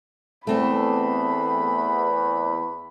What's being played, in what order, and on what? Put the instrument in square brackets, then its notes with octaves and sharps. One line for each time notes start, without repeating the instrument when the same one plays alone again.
[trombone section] E2 [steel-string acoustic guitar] A3 C4 A4 [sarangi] B5